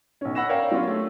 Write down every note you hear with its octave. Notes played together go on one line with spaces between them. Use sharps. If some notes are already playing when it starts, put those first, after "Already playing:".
B1 C#4
F#5 B5 E6 A#6 E7
A#4 C#5 D5 F5 G5
F#3 B3 C#4 D4 F4 G4
A3